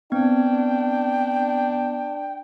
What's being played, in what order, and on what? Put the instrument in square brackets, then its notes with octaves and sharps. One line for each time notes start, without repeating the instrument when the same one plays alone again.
[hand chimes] B3 [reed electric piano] C4 G#6 [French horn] D4 [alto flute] G5